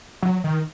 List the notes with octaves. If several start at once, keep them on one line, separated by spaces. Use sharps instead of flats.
F#3
D#3